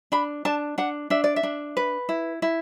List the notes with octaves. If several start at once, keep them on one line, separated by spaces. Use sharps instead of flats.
D4 B5
D4 A5
D4 F#5
D4 E5
D5
E5
D4
B4
E4
E4